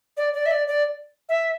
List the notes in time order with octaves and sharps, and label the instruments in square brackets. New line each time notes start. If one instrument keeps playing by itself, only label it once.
[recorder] D5
D5
E5
D5
D5
E5